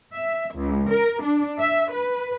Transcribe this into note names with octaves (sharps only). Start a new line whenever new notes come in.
E5
C#2
A#4
D4
E5
B4